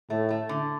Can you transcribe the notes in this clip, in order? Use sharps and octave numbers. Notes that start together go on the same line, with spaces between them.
A2 A3
A3
D3